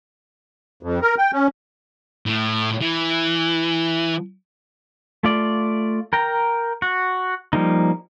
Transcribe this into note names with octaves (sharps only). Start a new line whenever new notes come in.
F2
A#4
G5
C#4
A2
E3
A3 F4 D5
A#4 G5 A#5
F#4
F3 G3 A#3 D#4